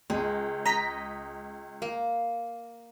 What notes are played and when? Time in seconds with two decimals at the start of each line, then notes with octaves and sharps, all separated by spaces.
0.10 C#2 G#3
0.65 D#5 A#5 B6
1.82 A#3